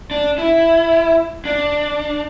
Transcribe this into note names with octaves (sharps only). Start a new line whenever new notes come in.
D4
E4
D4